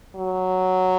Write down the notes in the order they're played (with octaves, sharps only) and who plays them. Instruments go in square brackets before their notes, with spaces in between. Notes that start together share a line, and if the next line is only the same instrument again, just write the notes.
[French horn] F#3